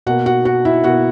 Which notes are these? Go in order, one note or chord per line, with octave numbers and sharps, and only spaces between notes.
B2 A#3 F#4 F#5
F#4 F#5
F#4 F#5
E4 E5
B2 A#3 F#4 F#5